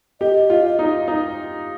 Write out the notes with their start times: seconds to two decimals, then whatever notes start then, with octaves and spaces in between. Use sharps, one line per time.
0.21 G4 D#5
0.50 F4
0.79 D#4
1.08 D#4